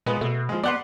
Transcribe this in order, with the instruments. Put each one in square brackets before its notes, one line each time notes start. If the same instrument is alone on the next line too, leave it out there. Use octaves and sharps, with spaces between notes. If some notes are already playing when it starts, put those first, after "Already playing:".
[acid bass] A#2 [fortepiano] G#3 B3 B4
[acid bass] B2 [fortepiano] A3
[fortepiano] F3 G#3
[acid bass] B3 [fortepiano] D5 F#5 C6